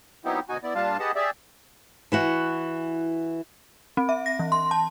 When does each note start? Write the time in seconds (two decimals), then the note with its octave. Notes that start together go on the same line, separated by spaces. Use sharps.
0.25 F#3 B3 C4 D#4 E4 G4
0.49 D2 B2 D#4 F#4 G#5
0.63 B3 E4 D5
0.75 A#2 G3 D4 F4 F5 A5
1.00 G4 G#4 B4 D#5 F#5 A5
1.15 G4 G#4 D5 E5
2.12 E3 E4 F#4
3.97 C4
4.09 E5
4.26 A#6
4.39 E3
4.52 C6
4.71 A5